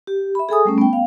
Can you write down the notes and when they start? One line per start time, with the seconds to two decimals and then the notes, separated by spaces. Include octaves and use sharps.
0.07 G4
0.35 E5 B5
0.49 G#4 A4 G#5 D#6
0.65 G3 A3 C#4
0.78 B3 G5
0.93 F5